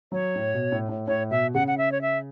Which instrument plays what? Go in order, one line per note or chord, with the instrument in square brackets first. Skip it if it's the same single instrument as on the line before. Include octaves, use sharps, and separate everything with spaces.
[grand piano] F#3 [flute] C#5
[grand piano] A2
B2
A2
A2
[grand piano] A2 [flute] C#5
[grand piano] B2 [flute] E5
[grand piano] C#3 [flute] F#5
[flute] F#5
E5
C#5
E5